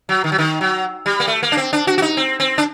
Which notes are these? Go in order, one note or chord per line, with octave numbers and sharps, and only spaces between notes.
F#3
D#3
F#3
D#3
F#3
G3
A#3
A3
A#3
D4
C4
D4
F#4
F#4
D#4
C4
C4
D4